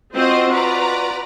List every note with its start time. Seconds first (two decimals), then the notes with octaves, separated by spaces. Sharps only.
0.15 C4 F4 F#4 C5 D#5
0.51 B4 D5 A#5